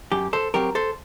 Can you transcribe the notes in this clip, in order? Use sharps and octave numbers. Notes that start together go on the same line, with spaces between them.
F#2 G4
A4 C5
F#3 C4 G4 A#4
A4 C5